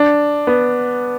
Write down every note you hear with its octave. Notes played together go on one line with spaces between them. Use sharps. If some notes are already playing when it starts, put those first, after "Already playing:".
Already playing: D4
B3